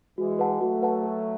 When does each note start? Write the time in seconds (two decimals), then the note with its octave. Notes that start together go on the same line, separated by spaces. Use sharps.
0.18 E3 G#3 F#4
0.39 B4 F#5 A5
0.61 F#3 A3 F#4
0.82 B4 F#5 A5
1.04 A4